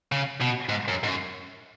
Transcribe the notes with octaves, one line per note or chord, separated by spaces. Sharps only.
C#3
B2
G#2
F#2
G#2
F#2